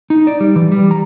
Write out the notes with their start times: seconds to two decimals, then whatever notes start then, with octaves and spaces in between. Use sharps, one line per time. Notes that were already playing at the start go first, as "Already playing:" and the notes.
0.10 D#4
0.27 D5
0.40 G3
0.56 E3
0.72 G3
0.91 A#5